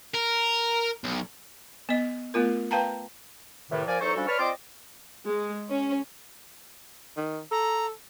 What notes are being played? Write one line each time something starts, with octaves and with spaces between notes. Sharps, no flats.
A#4
B1
B3 D#5
A3 B3 F4 A#4
B4 F5 G5 A5 A#5
A2 C3 D#3 E3
F3 A#4 D5 G#5
E2 F#3 D#4 A4 C5 C#6
F3 G3 C#4 D4 F#4 A4
B4 C#5 D5 A5 C#6 F6
C4 F4 D5 D#5 C6 D6
G#3
C#4
D#3
A4 A#5